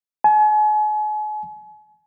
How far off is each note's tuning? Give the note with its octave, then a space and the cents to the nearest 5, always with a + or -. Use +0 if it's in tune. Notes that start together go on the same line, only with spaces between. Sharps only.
G#5 +40